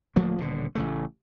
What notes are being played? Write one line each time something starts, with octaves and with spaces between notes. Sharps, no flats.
D1 F3 A3 A#3
D#1 B2 D3
A1 C#3 A3